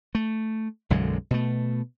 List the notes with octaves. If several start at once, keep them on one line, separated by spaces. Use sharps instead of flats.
A3
B1 F#2 D3 G#3
B2 A3